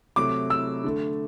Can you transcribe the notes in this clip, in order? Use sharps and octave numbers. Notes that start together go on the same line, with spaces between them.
C3 F#3 A3 D6
E6
D3 A3